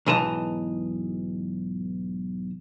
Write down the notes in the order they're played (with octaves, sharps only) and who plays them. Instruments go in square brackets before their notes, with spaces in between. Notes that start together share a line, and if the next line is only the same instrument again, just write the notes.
[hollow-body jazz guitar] B1 G#2 E3 D#5 A5 A#5